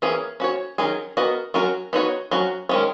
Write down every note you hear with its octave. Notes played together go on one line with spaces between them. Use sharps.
E3 A#3 C#4 G#4
C#4 F#4 C#5
D#3 F#3 C#4 G#4
B3 F#4 A#4 D#5
F#3 C#4 F#4 A#4
B3 D#4 F#4 C#5
F#3 C#4 F#4
D#3 G#3 C#4